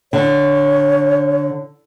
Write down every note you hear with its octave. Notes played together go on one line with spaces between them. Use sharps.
D3 C#5